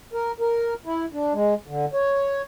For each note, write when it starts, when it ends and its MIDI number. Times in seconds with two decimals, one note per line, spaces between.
0.13 0.32 70
0.40 0.74 70
0.86 1.06 64
1.13 1.33 62
1.33 1.54 56
1.67 1.85 50
1.94 2.42 73